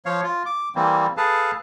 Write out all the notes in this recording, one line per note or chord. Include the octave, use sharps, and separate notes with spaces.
F3 C#5 F5
F4
D6
E3 G3 A#3 C4
G#4 A4 B4 F5 A5